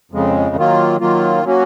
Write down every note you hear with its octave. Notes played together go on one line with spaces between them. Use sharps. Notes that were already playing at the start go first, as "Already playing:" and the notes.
F2 C#3 G#3
D#3 F#3 A#3 F4
D#3 F#3 A#3 F4
F#3 A#3 C#4 F#4